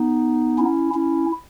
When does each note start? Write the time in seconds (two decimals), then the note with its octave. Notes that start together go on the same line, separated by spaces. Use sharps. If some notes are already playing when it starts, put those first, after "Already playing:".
Already playing: B3 D#4
0.58 C#4 E4
0.94 C#4 E4